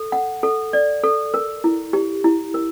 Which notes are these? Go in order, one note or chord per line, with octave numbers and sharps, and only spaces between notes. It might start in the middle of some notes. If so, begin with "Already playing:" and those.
Already playing: A4
F#5
A4
D5
A4
A#4
E4
G4
E4
A#4